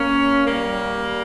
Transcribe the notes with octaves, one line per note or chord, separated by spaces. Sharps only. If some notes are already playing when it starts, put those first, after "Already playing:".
Already playing: A#3 C#4
G3 A#3